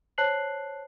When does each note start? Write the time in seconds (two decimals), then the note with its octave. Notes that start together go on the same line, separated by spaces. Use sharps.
0.18 C5 C#5 A5 F#6 C7 F#7